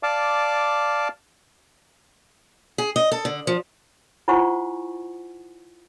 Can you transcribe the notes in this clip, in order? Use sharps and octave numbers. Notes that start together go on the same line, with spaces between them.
D5 F5 A5 D6
G#4
D#5
A4
D3
F3
E4 F4 C5 F#5 G#5 C#6